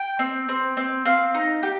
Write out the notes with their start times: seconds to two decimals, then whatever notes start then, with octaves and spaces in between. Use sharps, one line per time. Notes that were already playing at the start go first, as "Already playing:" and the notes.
Already playing: G5
0.19 C4
0.49 C4
0.77 C4
1.05 C4 F5
1.34 D#4
1.63 G4